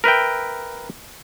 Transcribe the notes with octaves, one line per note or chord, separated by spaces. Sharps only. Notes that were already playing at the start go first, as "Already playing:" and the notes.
A#4 B4 E5 G5